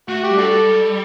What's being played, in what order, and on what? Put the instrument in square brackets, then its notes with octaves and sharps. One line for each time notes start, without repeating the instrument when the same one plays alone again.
[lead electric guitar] A3 [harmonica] F#4
[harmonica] G4
[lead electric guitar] G3
[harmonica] D4 F#4 A4